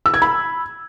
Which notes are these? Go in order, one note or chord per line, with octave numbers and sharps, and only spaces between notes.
E6
G#6
B5